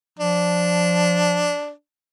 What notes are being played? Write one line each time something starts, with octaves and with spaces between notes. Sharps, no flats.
F3 D4